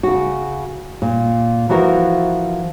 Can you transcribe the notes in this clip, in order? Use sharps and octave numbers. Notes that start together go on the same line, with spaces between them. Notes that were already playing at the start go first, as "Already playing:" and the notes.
C#3 F#4
A#2
E3 F3 E4 F#4 A#4 C5